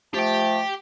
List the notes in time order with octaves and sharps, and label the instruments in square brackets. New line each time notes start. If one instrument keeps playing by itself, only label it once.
[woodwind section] F3 A3 A5 [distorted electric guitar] G4 G5